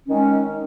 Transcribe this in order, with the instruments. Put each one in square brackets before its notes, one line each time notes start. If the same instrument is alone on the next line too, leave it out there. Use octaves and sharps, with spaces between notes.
[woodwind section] D#3 G#3 C#4